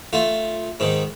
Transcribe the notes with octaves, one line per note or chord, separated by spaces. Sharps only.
A3 F4
G#2 D#3